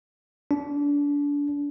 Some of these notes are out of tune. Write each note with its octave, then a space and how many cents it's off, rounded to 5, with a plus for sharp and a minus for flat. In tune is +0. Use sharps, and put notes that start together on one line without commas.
D4 -30